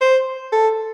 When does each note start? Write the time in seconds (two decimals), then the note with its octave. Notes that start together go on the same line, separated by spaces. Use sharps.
0.01 C5
0.52 A4